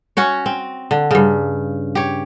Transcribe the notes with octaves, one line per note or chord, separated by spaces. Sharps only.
C#4 F#4 C#5
C4
D3
G2 C#3
G4 C#5